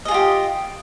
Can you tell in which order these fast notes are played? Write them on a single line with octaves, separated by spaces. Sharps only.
D#5 G#4 F4 G4